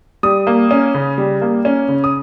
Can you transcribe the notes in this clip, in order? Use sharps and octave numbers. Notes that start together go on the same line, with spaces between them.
G3 D#6
A#3
C#4
C#3
G3
A#3
C#4
C#3
D#6